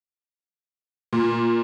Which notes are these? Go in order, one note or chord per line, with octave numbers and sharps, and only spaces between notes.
A#2